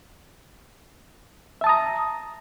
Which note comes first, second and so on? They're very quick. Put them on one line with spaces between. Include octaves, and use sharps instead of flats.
E5 A5 D#6 A#5